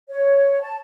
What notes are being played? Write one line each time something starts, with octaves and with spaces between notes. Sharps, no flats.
C#5
A5